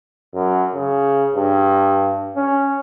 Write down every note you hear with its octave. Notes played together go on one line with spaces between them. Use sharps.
F#2
C#3
G2
C#4